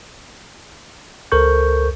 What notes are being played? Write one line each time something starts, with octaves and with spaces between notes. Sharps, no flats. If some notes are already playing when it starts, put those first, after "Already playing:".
C#2 A4 A#4 C5 C#6 G6